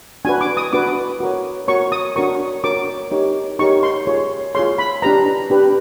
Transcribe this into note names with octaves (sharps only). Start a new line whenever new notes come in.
D4 F#4 B4 G#5
D6
D#6
D4 F#4 B4 D6
F#4 A#4 C#5
F#4 A#4 C#5 C#6
D#6
D4 F#4 A#4 C#5 C#6
D4 F#4 A#4 C#5 D6
D#4 G4 A#4 C#5
D#4 G4 A#4 C#5 C#6
C6
F4 G#4 C#5
F4 G#4 C#5 C6
B5
D4 G4 B4 A#5
D4 G4 B4